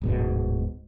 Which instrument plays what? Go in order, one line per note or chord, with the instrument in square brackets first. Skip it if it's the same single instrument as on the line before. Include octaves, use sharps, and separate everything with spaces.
[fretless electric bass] D1 G#2 B2